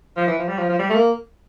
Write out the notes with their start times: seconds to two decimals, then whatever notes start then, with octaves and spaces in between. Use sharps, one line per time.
0.17 F3
0.27 E3
0.38 F3
0.48 G3
0.58 F3
0.69 F3
0.79 G3
0.90 A3
0.95 A#3